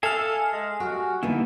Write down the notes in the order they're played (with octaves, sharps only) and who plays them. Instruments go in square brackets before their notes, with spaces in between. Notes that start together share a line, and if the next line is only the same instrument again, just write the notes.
[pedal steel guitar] G#4 E5 F5 [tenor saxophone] A4 [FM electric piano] G#5 F6
[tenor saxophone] G#3
[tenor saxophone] F#4 [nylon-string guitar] G4 G5
[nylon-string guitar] D3 A#3 B3 [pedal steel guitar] G3 D#4 E4